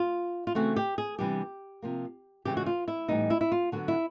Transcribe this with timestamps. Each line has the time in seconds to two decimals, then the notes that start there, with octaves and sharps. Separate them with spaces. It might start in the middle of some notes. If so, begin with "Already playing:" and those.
Already playing: F4
0.47 F4
0.55 C#3 E3 A3 C4 F#4
0.76 G4
0.98 G#4
1.19 C3 E3 G3 B3 D4 G4
1.82 C3 F3 A#3
2.45 C#3 E3 G#3 C#4 G4
2.57 F#4
2.66 F4
2.88 E4
3.08 A2 E3 G3 B3 D#4
3.30 E4
3.41 E4
3.52 F4
3.72 D3 F#3 B3 F#4
3.88 E4